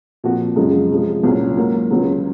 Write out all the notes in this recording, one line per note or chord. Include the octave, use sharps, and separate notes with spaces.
A#2 F3 C4 F#4
F#2 C#3 F3 G#3
C3 F3 G#3
C2 A#2 F#3 C#4
G#2 F#3 A#3
C#2 C#3 F#3